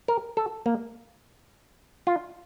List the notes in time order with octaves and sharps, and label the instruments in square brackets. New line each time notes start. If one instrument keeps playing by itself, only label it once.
[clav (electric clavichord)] A#4
A4
A#3
F4